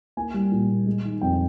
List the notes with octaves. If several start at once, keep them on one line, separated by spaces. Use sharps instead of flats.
A#3 G#5
G3
A#2
A#2
G#3
D#3
F2 G5